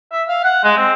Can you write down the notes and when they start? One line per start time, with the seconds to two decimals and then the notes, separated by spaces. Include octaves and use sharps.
0.12 E5
0.29 F5
0.44 F#5
0.64 G#3
0.77 C4